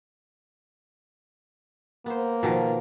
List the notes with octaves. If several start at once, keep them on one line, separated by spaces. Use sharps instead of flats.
A#3 B3 C5
B2 D#3 F3